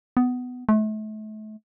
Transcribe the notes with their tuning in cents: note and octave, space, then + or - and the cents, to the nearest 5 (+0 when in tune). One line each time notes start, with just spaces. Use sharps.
B3 +15
A3 -35